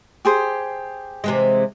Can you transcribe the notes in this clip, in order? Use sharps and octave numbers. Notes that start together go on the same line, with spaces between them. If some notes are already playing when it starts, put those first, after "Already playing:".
G4 G#4 C5
C3 E3 G#3